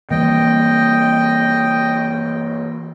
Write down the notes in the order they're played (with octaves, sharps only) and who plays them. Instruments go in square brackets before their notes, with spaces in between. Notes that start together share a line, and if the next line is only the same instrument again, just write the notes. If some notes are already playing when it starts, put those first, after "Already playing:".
[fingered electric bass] E3 G3 A#3 [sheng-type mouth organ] D#5 G5